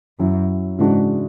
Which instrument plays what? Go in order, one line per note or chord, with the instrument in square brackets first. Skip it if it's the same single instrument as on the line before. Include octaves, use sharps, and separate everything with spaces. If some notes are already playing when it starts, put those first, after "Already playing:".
[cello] F#2 [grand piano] F#3 C#4 E4
[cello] G#2 [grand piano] C#3 E3 G#3 D4 F#4